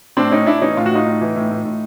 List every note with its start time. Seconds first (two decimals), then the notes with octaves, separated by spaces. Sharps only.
0.17 A2 C4 D4
0.31 A2 C#4 D#4
0.46 A2 D4 E4
0.62 E3 C#4 D#4
0.77 A2 F4
0.86 F#4
0.91 A2 D#4 F4
1.07 A2
1.21 E3
1.36 A2
1.51 A2
1.65 A2